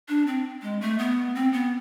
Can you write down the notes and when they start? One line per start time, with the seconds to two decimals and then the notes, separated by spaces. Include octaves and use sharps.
0.09 D4
0.27 C4
0.62 G#3
0.81 A3
0.99 B3
1.35 C4
1.53 B3